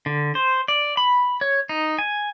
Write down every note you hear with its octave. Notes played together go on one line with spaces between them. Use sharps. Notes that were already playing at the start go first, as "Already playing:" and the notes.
D3
C5
D5
B5
C#5
D#4
G#5